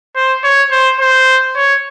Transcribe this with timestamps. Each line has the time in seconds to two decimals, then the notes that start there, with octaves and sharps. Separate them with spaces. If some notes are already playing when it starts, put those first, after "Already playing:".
0.16 C5
0.44 C#5
0.72 C5
1.00 C5
1.56 C#5